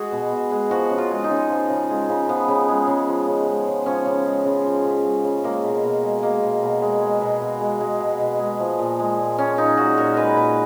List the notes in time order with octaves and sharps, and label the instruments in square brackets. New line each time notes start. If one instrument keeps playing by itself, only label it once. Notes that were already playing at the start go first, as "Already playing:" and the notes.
Already playing: [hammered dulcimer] G#3 F#4 G#4
B2
B2
G#3
F3 F#4
C#3
F4
G#3
D#4
C#3
F3
C#3
G#3
C#3
F3 B3
C#3
G#3
C#3
F3
C#3
G#3
C#3
F3 C#4
C#3
G#3
C#3
F3
C#3
G#3
C#3
G#3 A#3
B2
B2
G#3
G#3 A#3
B2
B2
G#3
G#3
B2
B2
G#3
G#3
B2
B2
G#3
F3
A#2
G#3
A#2
F3 C#4
A#2 D#4
G#3 F#4
A#2 A#4
G#3 B4
A#2 B4